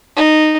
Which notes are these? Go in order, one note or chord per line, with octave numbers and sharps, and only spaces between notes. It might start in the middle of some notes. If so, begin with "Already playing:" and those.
D#4